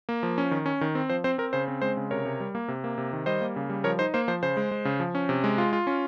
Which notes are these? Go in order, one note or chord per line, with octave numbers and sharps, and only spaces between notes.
A#3
F3
C#4
D#3
C#4
D#3
C4
F3 C5
C4 C5
C4 A#4
C#3 C5
C4
G#3 C5
C#3
C3 A#4 C#5
C3
G3
A#3
C3
A#3
C3
D#3
G3 C5 D#5
A#3
C#3
G3
F3 A#4 C#5
D#4 C5
A#3 C5
F3 C5
C#3 C5
G#3
G#3
C#3
F3
C#4
C3
G#3
F4
F4
C#4